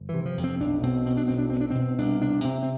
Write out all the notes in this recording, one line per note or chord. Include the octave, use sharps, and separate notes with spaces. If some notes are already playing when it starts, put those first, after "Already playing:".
Already playing: G1
C3 E3
F3
F2
C4
B1 D4
B2 C4
B2 C4
D4
B1 C4
D4
B1 C4
D4
B2 C4
C2 D4
C3 D4
C3 C4
C4